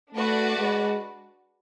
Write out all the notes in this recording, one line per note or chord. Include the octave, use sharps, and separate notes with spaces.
A3 D4 F#4 B4 D5
G#3